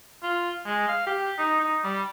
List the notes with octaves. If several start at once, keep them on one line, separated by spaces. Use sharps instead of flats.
F4
G#3
F5
G4
D#4
D#4
G3